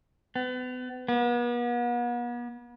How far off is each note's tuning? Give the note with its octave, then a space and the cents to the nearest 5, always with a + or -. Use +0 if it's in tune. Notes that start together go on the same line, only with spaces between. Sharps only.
B3 +35
B3 -40